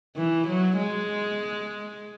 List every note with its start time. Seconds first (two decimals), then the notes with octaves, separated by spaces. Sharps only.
0.16 E3
0.47 F#3
0.77 G#3